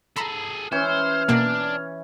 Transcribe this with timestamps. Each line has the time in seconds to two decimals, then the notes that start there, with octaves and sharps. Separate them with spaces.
0.16 G#4 A4 A#5 B5
0.72 E3 C#4 C5 F6
1.29 B2 A#3 D4